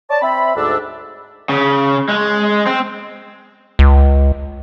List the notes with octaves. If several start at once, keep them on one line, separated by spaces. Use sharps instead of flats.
C#5 D5 A5
C4 E5 B5
D2 G#2 D4 E6
C#3
G#3
C4
C#2